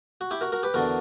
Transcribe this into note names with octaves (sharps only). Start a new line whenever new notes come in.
F#4
E4 G4
F#4 A#4
F#4 A#4
G4 B4
E2 D3 F#4 A#4